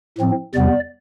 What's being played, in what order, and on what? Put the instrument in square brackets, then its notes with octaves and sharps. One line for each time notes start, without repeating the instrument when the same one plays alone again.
[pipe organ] A2 F3 C4
E2 C3 G3 B3 D5